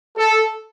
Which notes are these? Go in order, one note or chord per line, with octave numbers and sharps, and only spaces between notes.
A4